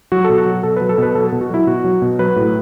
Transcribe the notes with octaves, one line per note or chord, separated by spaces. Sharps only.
F#3 F#4
B2 A4
F#4
F#3
B2 A4
B4
F#3
A4
B2 B4
F#3 A4
A4
B2
F#4
F#3 E4
B2 F#4
F#3
B2
F#3 B4
A2